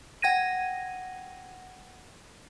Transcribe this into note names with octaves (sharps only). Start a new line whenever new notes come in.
F#5 G5 G#6 A#6 D#7